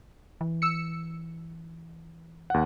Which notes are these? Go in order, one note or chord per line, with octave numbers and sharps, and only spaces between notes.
E3
E6 C#7
D#2 F#5